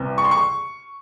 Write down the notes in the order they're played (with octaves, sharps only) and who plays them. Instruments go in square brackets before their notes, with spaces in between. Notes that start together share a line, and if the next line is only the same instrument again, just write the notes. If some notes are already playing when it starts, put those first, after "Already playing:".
Already playing: [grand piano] C2 C3 E3
C#6
C6
C#6